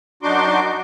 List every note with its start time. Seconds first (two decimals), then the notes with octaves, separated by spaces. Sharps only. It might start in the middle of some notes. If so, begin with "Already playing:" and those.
0.23 F#2 D4 D#4 F#4 C6 D6